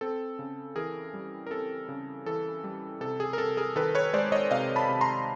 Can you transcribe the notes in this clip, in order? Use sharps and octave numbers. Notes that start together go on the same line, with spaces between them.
C4 A4
C#3
E3 G#4 A#4
G3
A#4
C4 A4
C#3
E3 A4
G3
C3 A4
G#4
A#4
C3 A4
G#4 A#4
D#3 A4 B4
B4 C#5
G#3 C5 D5
C#5 D#5
C3 D#5 F5
A5 B5
C3
A#5 C6